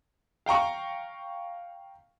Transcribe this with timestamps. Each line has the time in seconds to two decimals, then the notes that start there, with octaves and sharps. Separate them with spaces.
0.46 F5 G5 A#5 C#6